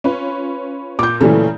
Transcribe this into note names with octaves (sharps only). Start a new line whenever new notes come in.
C#4 F4 B4
A#2 D6 G6
A#2 C#3 E3 F#3 A3